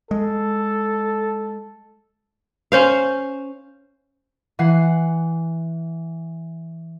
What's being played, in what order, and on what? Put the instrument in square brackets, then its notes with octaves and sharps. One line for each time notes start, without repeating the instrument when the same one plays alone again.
[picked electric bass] G#3 [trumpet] A4
[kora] C#4 C5 F5
[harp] E3 F#5 C7